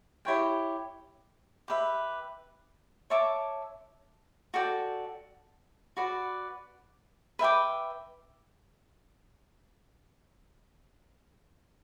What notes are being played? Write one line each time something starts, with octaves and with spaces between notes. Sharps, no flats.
E4 G4 C#5 G5
G4 B4 E5
C#5 E5 A5 D6
F#4 A4 D5 G5
F#4 B4 D5
B4 E5 G5 D6